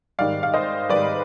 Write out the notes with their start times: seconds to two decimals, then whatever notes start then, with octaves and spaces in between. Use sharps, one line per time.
0.19 G#2 D#3 G3 D5 F5
0.43 F5
0.54 C5 D#5
0.89 G#2 D#3 G3 B4 D5